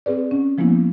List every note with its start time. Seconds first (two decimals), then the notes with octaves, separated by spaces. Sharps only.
0.06 C4 G#4 B4 D5
0.31 C#4
0.58 F3 G#3 A#3 B3 E4